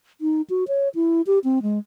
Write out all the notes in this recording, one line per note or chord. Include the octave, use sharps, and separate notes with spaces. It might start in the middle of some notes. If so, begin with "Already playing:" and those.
D#4
F#4
C#5
E4
G4
C4
G#3